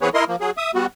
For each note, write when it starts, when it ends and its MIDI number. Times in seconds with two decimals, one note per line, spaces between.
0.01 0.09 52
0.01 0.09 59
0.01 0.09 60
0.01 0.09 68
0.01 0.09 71
0.01 0.09 73
0.14 0.25 64
0.14 0.25 70
0.14 0.25 75
0.14 0.25 84
0.28 0.36 53
0.28 0.36 58
0.41 0.51 54
0.41 0.51 68
0.58 0.71 76
0.58 0.71 87
0.74 0.86 55
0.74 0.86 59
0.74 0.86 66